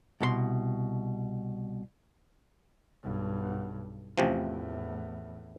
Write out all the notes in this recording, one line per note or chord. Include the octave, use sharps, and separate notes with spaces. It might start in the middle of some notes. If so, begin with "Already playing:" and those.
C2 B2 A4 C6
B1 G2
A1 E2 A2 C3 F3